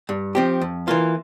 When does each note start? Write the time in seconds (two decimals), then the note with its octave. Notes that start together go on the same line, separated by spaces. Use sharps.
0.09 G2
0.35 F3 C4 G4
0.61 F2
0.88 E3 A#3 F4